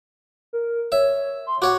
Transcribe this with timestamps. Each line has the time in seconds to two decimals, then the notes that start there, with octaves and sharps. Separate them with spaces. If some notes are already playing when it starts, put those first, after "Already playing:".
0.53 A#4
0.92 C#5 E5
1.47 C6
1.62 F#4 C#5 F#5 D6